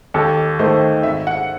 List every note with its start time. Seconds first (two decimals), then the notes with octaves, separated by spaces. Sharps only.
0.14 D#2 A4
0.59 D#3 A3 C5
1.03 G#1 E5
1.27 F#5